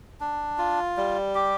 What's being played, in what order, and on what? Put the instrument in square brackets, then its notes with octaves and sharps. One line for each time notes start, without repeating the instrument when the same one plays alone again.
[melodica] D4
F4
G3
G4